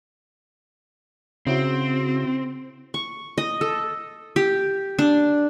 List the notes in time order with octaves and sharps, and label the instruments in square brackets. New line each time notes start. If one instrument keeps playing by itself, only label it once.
[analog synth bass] C#3 [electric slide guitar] C4 [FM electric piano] C#4 E4 F#4
[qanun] C#6
D#5
A4
G4
D4